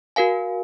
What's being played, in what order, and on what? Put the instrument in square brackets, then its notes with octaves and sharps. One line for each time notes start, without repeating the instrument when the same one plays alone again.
[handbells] F#4 A#4 F5 G#5